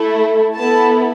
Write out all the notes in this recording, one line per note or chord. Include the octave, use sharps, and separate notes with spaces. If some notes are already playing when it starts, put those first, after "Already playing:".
Already playing: A3 E4 A4
B3 E4 A4 A5